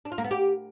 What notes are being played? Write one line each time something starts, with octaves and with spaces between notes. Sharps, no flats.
D4
F4
A#3
B3
G4